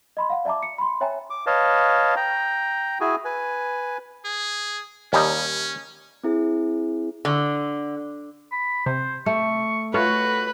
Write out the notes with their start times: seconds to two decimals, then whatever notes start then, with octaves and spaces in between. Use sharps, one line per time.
0.17 D#5 B5 C6
0.30 F5 F#5
0.45 D5 E5 A5 A#5 D6
0.63 C#7
0.78 B5 C6
1.01 C#5 E5 G5 G#5 A#5
1.30 D6
1.46 B4 C#5 D#5 F5 A5
2.16 G5 A#5
3.01 E4 F#4 G#4 G#5
3.25 B4 G#5
4.25 G#4
5.13 D#2 G3 C#4 D#4
6.23 C4 E4 G#4
7.25 D3
8.52 B5
8.86 C3 C5
9.26 A3 C#6
9.94 A3 F4 F#4 B4 C#5